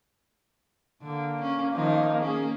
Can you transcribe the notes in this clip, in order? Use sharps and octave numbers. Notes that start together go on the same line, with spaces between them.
D3 A#3
C#4
D#3 F3 D#4
A#3 C#4 G#4